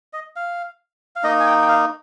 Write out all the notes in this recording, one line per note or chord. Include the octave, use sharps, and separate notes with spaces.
D#5
F5
F5
A#3 D#4 D#5
G#5
G5
G5
F5